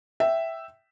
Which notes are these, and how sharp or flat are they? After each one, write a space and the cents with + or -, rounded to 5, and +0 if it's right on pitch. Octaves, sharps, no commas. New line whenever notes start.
E5 +0 G5 -15